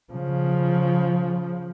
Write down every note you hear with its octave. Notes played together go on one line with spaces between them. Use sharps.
C#3 F3